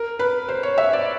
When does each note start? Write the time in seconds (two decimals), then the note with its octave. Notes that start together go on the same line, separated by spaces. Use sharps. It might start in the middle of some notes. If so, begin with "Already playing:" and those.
Already playing: A#4
0.19 B4
0.49 C5
0.63 C#5
0.78 E5
0.93 D5